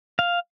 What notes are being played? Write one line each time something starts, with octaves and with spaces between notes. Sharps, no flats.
F5